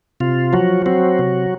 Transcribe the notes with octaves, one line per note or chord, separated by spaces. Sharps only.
C3 F4
F3 F#3 F#4
F#3 C4 F#4
C3